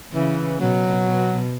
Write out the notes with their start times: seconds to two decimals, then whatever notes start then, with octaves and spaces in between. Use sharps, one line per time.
0.13 C#3 E3
0.59 B2 F#3
1.06 B2